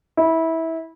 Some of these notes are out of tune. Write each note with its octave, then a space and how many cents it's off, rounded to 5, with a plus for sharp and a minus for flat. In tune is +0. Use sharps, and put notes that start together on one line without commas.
E4 -20